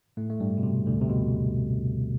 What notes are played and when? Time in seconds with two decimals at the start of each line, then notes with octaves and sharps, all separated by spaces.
0.17 A2 A3
0.30 A3
0.40 G2 G3
0.57 B2
0.63 C3
0.86 D2 D3
1.01 C3
1.10 B2